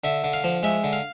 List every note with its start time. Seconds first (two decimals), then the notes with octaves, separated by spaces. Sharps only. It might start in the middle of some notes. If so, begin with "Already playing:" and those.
0.04 D3 E5
0.24 D3
0.33 F5
0.44 F3
0.63 G#3 E5
0.84 D3
0.93 F5